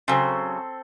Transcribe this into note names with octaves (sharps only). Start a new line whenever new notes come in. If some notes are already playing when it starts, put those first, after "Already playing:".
C#3 F#3 C4 A4 C6